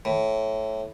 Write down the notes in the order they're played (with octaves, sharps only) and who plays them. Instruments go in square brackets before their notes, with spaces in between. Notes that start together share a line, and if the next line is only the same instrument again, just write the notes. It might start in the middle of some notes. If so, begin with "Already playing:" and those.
[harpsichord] A2